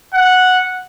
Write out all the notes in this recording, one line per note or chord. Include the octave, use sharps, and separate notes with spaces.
F#5